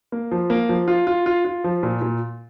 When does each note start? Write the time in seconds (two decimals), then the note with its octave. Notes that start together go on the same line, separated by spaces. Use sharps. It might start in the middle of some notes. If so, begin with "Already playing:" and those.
0.12 A#3
0.31 F3
0.50 A#3
0.69 F3
0.88 F4
1.07 F4
1.26 F4
1.45 F4
1.64 F3
1.83 A#2
2.02 A#2